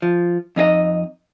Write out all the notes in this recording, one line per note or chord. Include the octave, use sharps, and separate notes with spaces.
F3
F2 D#4 G#4 D#5